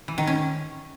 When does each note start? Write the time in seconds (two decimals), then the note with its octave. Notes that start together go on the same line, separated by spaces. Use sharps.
0.08 E3
0.18 D#3
0.27 C#4